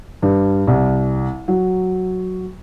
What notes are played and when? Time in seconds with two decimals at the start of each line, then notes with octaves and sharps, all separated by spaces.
0.22 G2
0.67 C2
1.48 F#3